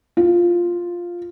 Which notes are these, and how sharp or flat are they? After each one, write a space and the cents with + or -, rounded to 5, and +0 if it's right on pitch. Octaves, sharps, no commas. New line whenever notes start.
F4 +0